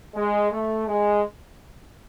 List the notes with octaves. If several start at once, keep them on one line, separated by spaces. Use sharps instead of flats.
G#3
A3
G#3